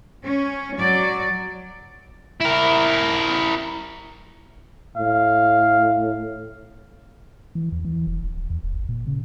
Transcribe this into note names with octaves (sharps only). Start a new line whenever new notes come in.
C#4
F#3 D5
E4 A#4
A2 F5
E3
E2
E3
F1
D#1
D1
E2
D#1
G1
A#2
C#3